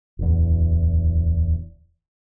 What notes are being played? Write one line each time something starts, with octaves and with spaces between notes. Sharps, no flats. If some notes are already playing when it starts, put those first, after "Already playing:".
D1 E2